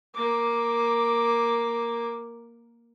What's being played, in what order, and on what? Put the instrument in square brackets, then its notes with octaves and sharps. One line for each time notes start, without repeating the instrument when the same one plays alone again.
[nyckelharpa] A#3 D6